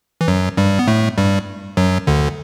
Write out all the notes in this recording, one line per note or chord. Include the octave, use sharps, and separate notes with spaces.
E3
F#2 F#3
G2 G3
B3
A2 A3
G2 G3
F#2 F#3
D2 D3